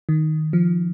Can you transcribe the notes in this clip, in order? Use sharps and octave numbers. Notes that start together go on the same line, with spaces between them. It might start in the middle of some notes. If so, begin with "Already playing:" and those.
D#3
F3